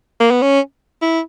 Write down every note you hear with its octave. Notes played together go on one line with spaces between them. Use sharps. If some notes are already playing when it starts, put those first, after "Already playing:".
A#3
B3
C#4
E4